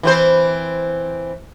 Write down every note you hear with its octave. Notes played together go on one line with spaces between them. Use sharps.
E3 C4 C5